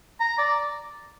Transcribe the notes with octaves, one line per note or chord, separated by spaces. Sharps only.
A#5
D5